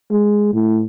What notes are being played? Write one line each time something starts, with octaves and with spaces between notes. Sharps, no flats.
G#3
A2